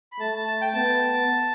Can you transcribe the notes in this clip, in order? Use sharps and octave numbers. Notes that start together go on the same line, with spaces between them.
B5
A3 A5
A5
A5
G5
B3 A5